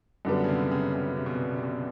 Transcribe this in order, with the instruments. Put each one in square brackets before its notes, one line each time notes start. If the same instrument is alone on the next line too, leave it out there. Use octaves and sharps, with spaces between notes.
[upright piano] F#2 D3 G3 B3
[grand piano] C#3
C3
C#3
C#3
C3
B2
C3
C3
B2